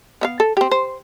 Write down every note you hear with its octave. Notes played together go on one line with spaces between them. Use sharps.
B3 E5 F5
A4
C4 G4
C5